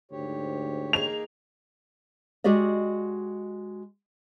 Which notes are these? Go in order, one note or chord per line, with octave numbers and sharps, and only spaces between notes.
D2 G#2 G4 C#5
A#3 D#4 G#4 F7
G#3 F#4 G4 D5 D#5